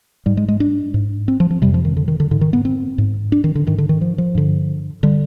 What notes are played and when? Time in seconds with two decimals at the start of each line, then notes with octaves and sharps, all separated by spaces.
0.26 G#2 G3
0.37 G#3
0.48 G#3
0.60 D4
0.94 G#2
1.28 C4
1.40 F3
1.51 F3
1.62 F2 C3 G3
1.74 F3
1.85 D#3
1.97 D3
2.08 D#3
2.20 D3
2.31 G#2 D3
2.41 D#3
2.53 B3
2.65 C4
2.98 G#2
3.32 D4
3.44 D#3
3.55 D3
3.67 G#2 D#3
3.78 D3
3.89 D#3
4.01 F3
4.18 F3
4.35 G2 D3
5.03 D3 G3